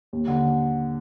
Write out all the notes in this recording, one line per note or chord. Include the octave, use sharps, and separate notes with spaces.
D#2
D3